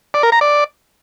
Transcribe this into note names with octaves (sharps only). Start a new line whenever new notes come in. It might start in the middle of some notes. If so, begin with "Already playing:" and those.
D5
A#4
A#5
D5